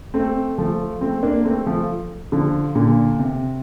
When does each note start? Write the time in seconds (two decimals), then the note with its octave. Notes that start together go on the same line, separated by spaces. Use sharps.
0.14 A3 C4
0.58 F3 A3
1.01 A3 C4
1.23 A#3 D4
1.45 A3 C4
1.66 F3 A3
2.32 D3 F3
2.75 A#2 D3
3.19 C3